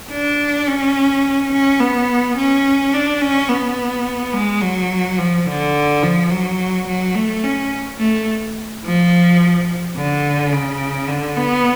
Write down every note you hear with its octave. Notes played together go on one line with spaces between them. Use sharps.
D4
C#4
C#4
B3
C#4
D4
C#4
B3
G#3
F#3
F3
D3
F3
F#3
F#3
A3
C#4
A3
F3
D3
C#3
D3
B3